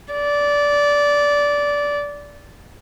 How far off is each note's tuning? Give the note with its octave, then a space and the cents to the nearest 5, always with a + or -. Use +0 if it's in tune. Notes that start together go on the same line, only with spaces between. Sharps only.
D5 -15